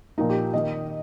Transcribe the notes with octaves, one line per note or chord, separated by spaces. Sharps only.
A#2 F3 A#3 D#4
G4
D#3 A#3 D#5